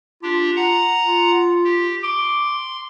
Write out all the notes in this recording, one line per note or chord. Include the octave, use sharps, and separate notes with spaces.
D4 F4 G4
F#5 A#5
F4
G4
C6 D6